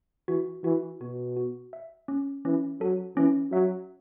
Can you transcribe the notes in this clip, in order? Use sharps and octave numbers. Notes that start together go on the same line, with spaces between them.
E3 F#4
E3 F#4
B2 F#4
F#4
E5
C#4
E3 C#4
F#3 A4
E3 C#4
F#3 E5